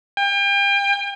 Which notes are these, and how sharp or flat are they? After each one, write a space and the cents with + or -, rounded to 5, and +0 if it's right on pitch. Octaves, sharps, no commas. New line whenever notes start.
G5 +35